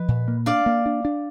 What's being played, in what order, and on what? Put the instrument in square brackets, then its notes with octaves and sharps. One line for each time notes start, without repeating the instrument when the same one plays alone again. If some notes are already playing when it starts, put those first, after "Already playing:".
Already playing: [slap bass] F3 [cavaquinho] B4 D#5
[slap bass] A#2
A#3
[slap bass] D4 [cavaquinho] D5 F5
[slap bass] A#3
D4
D4